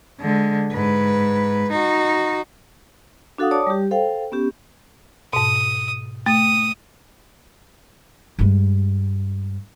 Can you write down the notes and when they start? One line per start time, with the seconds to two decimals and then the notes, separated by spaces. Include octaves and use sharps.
0.21 D3 G#3
0.72 G#2 B4
1.71 D#4 F#4
3.38 D4 F#4 A4 F5 F#5 D#6
3.51 C#5 D5 A5 D6 D#6
3.67 G3 G4
3.91 A4 C5 F5 G5
4.32 B3 C#4 G4
5.33 G#2 B2 D#6
6.26 A3 D#6
8.39 G2 G#3